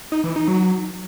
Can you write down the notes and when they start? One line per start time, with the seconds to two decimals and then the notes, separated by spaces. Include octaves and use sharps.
0.12 D#4
0.24 E3
0.36 D#4
0.48 F#3